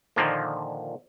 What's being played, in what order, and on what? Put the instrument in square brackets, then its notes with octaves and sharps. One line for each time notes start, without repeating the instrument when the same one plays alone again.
[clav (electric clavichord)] A#2 D3 D#3 F3 A#3